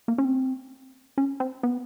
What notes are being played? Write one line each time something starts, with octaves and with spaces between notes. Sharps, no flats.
A#3
C#4
C4
C#4
C4
B3